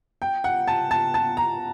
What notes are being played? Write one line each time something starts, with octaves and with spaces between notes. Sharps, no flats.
G5
F#5
A5
A5
A5
A#5